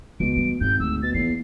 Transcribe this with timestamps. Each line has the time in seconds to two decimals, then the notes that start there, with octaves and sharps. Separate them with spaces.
0.20 C#2 B2 D7
0.36 E3 G3
0.61 G#1 G2 A#2 G6
0.80 D2 E6
1.03 B2 A6
1.14 E2 A#3 D#4 C7